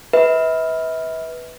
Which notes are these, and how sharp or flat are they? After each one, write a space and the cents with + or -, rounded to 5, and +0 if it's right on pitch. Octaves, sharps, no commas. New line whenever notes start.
B4 +0 E5 -40